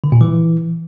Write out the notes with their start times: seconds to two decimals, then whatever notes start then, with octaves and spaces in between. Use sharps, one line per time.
0.04 D3
0.12 A#2
0.21 E3